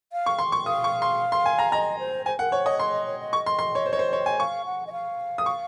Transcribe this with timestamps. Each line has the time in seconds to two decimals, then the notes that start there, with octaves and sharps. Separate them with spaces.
0.13 F5
0.26 C#6
0.39 C6
0.52 C#6
0.66 F5 D#6
0.84 C#6
1.02 C6
1.32 C6
1.46 G#5
1.59 A#5
1.72 D#5 A#5
1.99 C5
2.26 C5 G#5
2.39 A#4 F#5
2.52 C5 C#5
2.66 C#5 D#5
2.79 C#5 C6
2.92 D#5
3.06 C#5
3.19 D#5
3.33 C#6
3.46 C6
3.59 C6
3.75 C#5
3.86 C5
3.93 C#5
3.99 C5
4.13 C#5
4.26 G#5
4.39 F5 C#6
4.66 F#5
4.87 D#5
4.92 F5
5.38 D#6
5.46 C#6